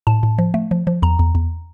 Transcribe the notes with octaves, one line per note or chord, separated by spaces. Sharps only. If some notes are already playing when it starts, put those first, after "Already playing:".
A2 A5
A2
F3
A3
F3
F3
E2 A#5
E2
E2